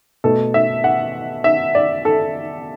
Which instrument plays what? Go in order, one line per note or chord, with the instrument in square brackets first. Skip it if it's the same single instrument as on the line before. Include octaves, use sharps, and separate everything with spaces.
[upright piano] B2 A3 A4
E5
F#5
E5
D5
A4